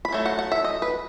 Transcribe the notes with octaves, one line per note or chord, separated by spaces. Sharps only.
B5
F#3 A3
F#5
F#5
E5
D#5
B4